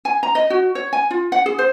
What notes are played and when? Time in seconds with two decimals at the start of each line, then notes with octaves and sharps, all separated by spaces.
0.05 G#5
0.23 A#5
0.35 D#5
0.50 F#4
0.75 C#5
0.93 G#5
1.11 F4
1.32 F#5
1.46 G#4
1.59 C5